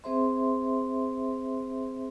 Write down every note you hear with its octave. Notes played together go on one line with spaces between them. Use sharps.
C4 G#4 C5 E5 C6